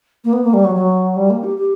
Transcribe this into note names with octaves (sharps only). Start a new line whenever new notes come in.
A#3
B3
A#3
G3
F#3
F#3
G3
A#3
G4
G4